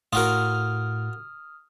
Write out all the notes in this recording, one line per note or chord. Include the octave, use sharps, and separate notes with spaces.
A2 F4 F#4 A#4 D#6 F6